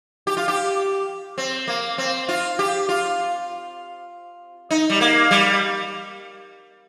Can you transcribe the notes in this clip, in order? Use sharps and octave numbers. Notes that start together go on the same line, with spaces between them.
G4
F4
G4
C4
A#3
C4
F4
G4
F4
D#4
G3
A#3
G3